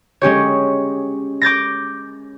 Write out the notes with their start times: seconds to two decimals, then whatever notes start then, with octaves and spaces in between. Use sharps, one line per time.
0.21 G#3 C#4 G4 C#5
1.41 D6 G6 A6 A#6